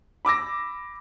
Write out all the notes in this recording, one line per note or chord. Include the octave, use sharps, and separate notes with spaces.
B5 D6 E6 A#6